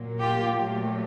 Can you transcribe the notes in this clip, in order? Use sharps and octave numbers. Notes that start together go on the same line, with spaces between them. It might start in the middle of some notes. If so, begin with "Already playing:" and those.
Already playing: A#2 F#3 A#3
F4 G4
A#2 F#3 A3